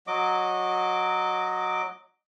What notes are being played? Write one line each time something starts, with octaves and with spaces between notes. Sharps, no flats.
F#3 D#5 D6